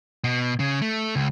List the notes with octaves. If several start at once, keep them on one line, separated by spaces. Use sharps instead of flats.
B2
C#3
A3
C#2